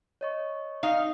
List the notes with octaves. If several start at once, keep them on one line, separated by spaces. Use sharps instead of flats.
C#5 D#5 C#6
D#4 F5